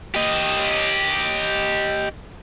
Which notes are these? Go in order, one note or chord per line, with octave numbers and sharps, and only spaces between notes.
G4 D#5